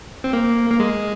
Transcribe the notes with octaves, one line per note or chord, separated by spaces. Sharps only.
C4
A#3
A#3
G#3